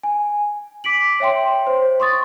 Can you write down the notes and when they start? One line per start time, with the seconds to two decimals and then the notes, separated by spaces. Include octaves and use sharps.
0.03 G#5
0.84 D6 B6 D7 F#7
1.20 C#5 E5 G5 C6
1.67 C5
2.00 C6 C#6 D#6 A6